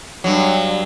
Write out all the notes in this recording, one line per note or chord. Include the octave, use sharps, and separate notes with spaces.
G2 F#3